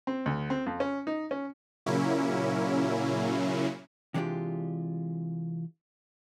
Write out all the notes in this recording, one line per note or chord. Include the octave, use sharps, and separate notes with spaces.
C4
D2
C4
F2
C#4
D#4
C#4
A#2 C#3 F#3 A#3 C#4 E4
C3 E3 G#3 D4 F4 G4